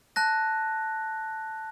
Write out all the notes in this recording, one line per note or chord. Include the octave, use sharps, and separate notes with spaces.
A5 F#6 A#6